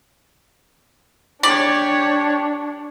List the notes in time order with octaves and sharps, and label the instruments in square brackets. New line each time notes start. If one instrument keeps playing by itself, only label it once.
[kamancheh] D4 [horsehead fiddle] G4 C#5 [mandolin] D5